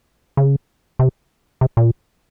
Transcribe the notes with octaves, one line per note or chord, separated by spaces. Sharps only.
C#3
C3
C3
A#2